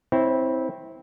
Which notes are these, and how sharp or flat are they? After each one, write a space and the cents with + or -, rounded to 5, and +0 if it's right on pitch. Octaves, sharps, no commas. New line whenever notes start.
C4 +0 E4 -20 C#5 -15